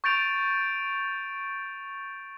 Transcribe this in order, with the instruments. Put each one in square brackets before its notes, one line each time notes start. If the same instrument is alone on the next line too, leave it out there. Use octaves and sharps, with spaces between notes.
[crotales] C#6 G6 A6 D7 F7